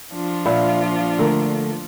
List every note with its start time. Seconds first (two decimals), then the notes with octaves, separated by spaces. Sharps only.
0.13 F3 D4 F4
0.46 A#2 E5 F5 B5
1.18 D3 A3 A#4